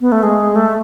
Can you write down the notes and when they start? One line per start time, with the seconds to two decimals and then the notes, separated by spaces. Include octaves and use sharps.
0.01 B3
0.12 A3
0.23 G#3
0.55 A3